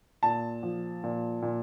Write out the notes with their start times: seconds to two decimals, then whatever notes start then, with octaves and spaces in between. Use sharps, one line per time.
0.23 A#2 A5
0.63 F3
1.04 A#2
1.42 A#2